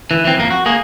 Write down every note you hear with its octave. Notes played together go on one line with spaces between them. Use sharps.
E3
E3 C4
F2 A#3
F#4
A#3 G#4